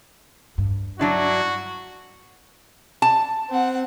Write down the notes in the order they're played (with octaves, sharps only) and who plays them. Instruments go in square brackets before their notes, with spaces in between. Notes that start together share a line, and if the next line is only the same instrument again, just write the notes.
[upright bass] G2
[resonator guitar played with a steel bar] F#3 D4 E4 [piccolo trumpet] F#4
[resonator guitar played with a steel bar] A5
[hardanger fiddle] C4 F#5